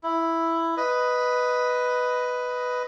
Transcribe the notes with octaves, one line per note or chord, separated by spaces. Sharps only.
E4
B4 D#5